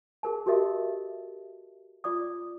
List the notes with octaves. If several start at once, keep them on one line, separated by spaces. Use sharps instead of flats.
G#4 A#4 A5
F#4 G4 A4 A#4 D#5 E5
F4 D5 D6 D#6